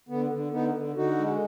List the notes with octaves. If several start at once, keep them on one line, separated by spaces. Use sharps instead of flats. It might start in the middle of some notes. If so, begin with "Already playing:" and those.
D3 B3
D3
D3 B3 D#4
D3
D3 D#4 F#4
G#3